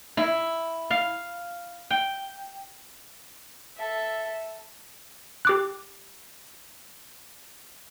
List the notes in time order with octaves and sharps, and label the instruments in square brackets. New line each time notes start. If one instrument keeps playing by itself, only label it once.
[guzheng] E4
F5
G5
[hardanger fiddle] A4 E5
[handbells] G4 D6 F#6